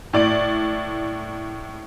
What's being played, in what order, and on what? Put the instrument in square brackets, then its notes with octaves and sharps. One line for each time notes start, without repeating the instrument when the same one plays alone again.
[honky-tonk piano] A2 D5 D7